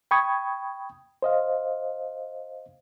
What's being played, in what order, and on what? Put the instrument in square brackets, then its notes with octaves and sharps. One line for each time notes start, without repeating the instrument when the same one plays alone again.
[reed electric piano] G5 B5 C#6 D#6 G#6
C5 D#5 F5